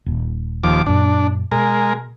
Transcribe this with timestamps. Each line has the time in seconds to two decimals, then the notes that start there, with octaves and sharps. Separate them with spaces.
0.06 D#1
0.64 D#2 F3 D6
0.86 F#2 A#2 D4
1.52 B2 G#3 A#4